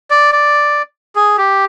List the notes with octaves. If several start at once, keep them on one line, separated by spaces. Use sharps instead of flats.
D5
D5
G#4
G4